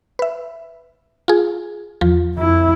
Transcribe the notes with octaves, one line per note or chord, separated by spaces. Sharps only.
B4 E5
F4 G#4
E2 F3 F4
F2 E4